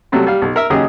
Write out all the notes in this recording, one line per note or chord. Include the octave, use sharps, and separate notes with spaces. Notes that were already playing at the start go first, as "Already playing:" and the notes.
C3 F#3 G3 A3
G3 F5
B1
A#4 E5
D#2 C#3 F#3 G4 G#4 D#5